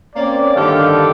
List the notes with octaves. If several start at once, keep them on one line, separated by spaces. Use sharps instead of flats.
A#3 C4 C#4 D5
G2 D3 D#3 G4 A4 F5